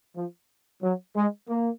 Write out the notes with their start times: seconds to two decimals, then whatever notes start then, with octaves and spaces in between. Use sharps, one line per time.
0.15 F3
0.82 F#3
1.15 G#3
1.48 A#3